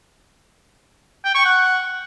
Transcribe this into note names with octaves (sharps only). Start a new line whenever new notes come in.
G5
C#6
F#5